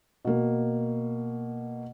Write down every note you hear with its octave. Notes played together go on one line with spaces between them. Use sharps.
B2 A#3